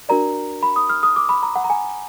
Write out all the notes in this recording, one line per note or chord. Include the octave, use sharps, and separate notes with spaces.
D4 F#4 A#4 D5 A#5
B5
D#6
F6
D#6
D6
B5
A#5
F#5
A#5
G#5